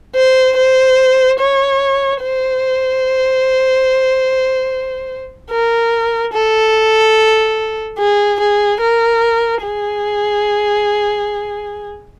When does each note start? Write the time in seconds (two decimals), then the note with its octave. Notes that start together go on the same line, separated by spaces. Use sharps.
0.16 C5
0.57 C5
1.39 C#5
2.22 C5
5.51 A#4
6.33 A4
7.99 G#4
8.40 G#4
8.80 A#4
9.63 G#4